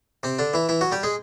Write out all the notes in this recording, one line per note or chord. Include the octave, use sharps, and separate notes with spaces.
C3 C4
D3 D4
E3 E4
E3 E4
F#3 F#4
G3 G4
G#3 G#4